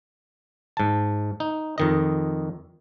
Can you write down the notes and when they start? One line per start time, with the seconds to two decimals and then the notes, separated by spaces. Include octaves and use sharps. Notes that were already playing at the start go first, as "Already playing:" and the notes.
0.77 G#2 A5
1.40 D#4
1.78 F2 D#3 D#5